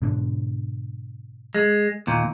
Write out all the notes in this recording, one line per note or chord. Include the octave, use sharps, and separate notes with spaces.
G#2 B2 D3
G#3
D#2 A#2